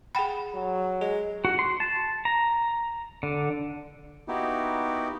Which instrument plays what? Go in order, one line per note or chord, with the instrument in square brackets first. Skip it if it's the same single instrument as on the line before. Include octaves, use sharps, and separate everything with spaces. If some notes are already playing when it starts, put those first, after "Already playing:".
[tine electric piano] G#4 F#5 [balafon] G5 B5
[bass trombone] F#3
[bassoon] G#3 [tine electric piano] G#4
[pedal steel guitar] F#4
C6
A5
A#5
D3
[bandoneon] A#3 B3 D#4 E4 F#4 G4